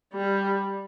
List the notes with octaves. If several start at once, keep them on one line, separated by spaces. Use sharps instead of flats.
G3